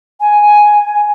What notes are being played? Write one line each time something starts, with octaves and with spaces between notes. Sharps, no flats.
G#5